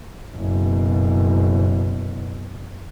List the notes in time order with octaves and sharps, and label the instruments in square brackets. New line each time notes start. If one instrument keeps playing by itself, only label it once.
[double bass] F#1 B2